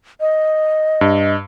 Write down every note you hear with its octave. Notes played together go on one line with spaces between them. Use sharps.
D#5
G2